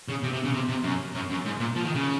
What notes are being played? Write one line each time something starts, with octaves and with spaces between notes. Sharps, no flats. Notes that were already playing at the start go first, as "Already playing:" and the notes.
C#3
C3
C3
C#3
C3
C3
F#2
F#2
F#2
G#2
A#2
F3
D#3
C#3